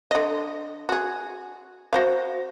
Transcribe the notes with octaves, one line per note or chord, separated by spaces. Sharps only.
D3 D#5
F#4 G#4
F#4 C5 F5